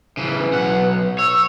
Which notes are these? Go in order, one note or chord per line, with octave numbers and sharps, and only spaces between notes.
C#3 E3
B4
B1 F#5
C#5 E6